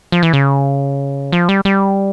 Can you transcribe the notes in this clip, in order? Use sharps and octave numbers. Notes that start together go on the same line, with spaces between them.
F3
E3
C#3
F3
G3
G3